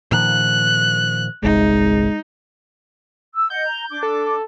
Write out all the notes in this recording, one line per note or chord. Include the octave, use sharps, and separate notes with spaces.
A#2 D#3 F3 F#6
G1 C2 G#3 D#4
E6
D#5 F#5 G6
A#5
D4 D6
A4